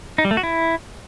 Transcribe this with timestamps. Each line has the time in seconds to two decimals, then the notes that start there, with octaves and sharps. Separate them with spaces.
0.18 D#4
0.25 G3
0.31 A3
0.37 F#4
0.43 E4